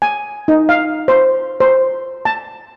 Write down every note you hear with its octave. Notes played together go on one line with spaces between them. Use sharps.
G#5
D#4
F5
C5
C5
A5